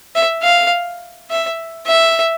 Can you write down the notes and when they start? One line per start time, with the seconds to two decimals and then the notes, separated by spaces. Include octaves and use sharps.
0.15 E5
0.43 F5
1.30 E5
1.87 E5